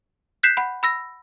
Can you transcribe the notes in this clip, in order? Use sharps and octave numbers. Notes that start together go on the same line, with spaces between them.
F#6 G6 B6 C7 E7
F#5 B5
B5 E6 A#6